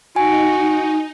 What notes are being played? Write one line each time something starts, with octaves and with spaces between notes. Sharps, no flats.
D#4 F#4 G#5